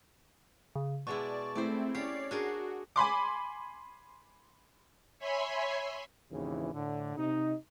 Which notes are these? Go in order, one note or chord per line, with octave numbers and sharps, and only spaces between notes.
C#3
B2 G#3 E4 D5 A5 C#6
A3 C4 E4 C5 D5
C#4 G4 C#5 D5 C7
D4 F#4 G#4 A#4
G#5 B5 C6 D6
C#5 E5 G#5 B5 C6
G#1 D#2 C#3 E3
A2 D3
C3 D#4